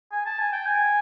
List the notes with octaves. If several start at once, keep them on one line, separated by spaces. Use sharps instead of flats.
G#5
A5
G#5
G5
G#5